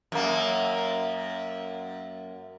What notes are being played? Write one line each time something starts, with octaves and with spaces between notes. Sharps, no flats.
F#2 A#3